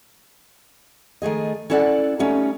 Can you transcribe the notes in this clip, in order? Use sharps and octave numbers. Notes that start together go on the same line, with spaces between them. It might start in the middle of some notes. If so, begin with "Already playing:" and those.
D#3 A3 G#4 D#5
C#4 E4 A4 D5 E5 F#5
G3 A3 B3 C#4 D#4